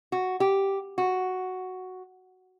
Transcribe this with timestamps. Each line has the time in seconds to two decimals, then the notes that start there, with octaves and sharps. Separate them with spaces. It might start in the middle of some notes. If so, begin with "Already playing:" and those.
0.12 F#4
0.40 G4
0.98 F#4